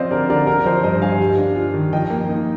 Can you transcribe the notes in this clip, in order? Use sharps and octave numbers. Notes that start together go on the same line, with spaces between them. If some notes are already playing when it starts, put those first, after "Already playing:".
Already playing: F3 C4 C5 D5 D#5 F5
D3 A#4 D5
D3 A#4 D5
D3 A#4 D5
F3 C5 D#5
G2 C5 D#5
G2 F5 G#5
G3
D4
F4
D#3
F3 D#5 G5
A#3
D#4